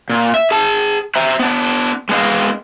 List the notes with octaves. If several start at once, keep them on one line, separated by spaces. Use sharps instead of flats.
A#2
E5
G#4 A5
C5 E5 A#5
B3 D4
G#3 B3 G#4 D#5 F5